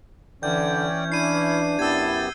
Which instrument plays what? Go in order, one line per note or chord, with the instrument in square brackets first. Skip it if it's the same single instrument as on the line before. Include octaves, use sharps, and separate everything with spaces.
[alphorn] D3 [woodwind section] E3 C#4 [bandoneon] D5 G5 [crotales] G6
[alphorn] D4 [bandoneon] E4 [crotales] C7 D#7
[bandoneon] F#2 B3 G4 [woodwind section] E4 A5 [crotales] E6 G#6